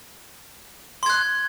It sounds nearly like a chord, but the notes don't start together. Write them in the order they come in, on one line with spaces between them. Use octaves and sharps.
C6 G#6 F#6